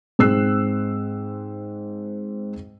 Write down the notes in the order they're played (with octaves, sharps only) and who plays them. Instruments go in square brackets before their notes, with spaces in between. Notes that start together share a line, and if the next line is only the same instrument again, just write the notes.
[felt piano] G#2 C4 G#4 E6 F#6 C7